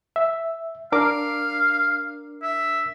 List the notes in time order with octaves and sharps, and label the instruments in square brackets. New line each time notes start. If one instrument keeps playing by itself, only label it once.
[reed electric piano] E5
[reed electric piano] D4 A#4 D6 [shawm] F5
[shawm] E5